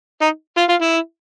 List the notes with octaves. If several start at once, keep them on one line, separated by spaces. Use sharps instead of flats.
D#4
F4
F4
E4